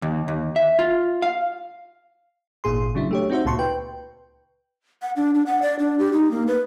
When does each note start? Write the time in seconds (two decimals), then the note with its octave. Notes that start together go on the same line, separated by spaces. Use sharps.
0.02 D#2
0.28 D#2
0.56 E5
0.79 F4
1.22 F5
2.64 G#1 A#2 G#4 C6
2.95 C#3 F#3 D4 E4
3.11 A3 G4 C#5
3.30 C4 D#4 F#4 C5 E5
3.45 C#2 A#2 A5 C6 C#6
3.59 B4 G5
5.02 F#5
5.16 D4
5.35 D4
5.46 F#5
5.62 D5
5.79 D4
5.99 G4
6.13 D#4
6.31 A#3
6.47 B4